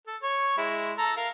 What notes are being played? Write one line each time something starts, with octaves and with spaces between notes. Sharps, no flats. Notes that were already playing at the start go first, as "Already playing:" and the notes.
A4
C#5
G#3 E4
A4 A#5
A#4 F5